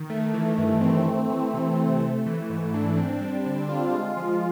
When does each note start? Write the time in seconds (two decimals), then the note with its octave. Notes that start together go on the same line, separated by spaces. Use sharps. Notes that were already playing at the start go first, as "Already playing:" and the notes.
Already playing: D#3
0.10 A3
0.33 E3
0.58 G2
0.81 C4
1.06 A3
1.30 E3
1.54 C3
1.78 C3
2.01 A3
2.26 E3
2.50 G#2
2.74 D4
2.97 C4
3.21 G3
3.46 D3
3.69 F4
3.94 G#3
4.17 F3